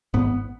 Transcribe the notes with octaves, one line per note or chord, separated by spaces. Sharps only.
G#1 G#2 B3